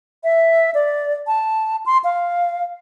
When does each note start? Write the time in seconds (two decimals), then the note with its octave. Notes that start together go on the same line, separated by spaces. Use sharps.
0.24 E5
0.74 D5
1.27 A5
1.86 C6
2.04 F5